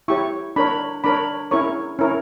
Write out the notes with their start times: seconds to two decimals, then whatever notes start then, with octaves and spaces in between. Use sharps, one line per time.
0.08 E4 G4 C#5 C#6
0.56 D4 A#4 C#5 B5
1.04 D4 A#4 C#5 B5
1.51 C#4 E4 A#4 C#5 C#6
1.99 C#4 E4 A#4 C#5